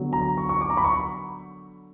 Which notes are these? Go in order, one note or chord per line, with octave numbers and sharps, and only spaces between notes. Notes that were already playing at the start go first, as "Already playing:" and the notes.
Already playing: D3 F#3 B3
A#5
C#6
C#6
D6
A#5
B5
C#6